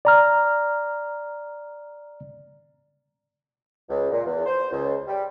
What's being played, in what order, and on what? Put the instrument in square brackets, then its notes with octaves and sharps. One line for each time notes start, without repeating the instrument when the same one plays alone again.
[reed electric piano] D5 A#5 F6
[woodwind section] C#2
A#2
E2
C5
C#2
G3